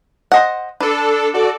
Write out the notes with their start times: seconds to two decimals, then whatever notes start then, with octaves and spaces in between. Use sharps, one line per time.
0.32 C5 D#5 F#5
0.80 D4 A4 B4
1.34 F#4 A4 D5